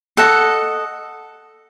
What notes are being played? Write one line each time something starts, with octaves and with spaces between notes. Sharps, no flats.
A4 D#5 F#5